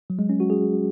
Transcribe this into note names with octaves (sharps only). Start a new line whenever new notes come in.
F#3
G#3
C#4
F#4
G#4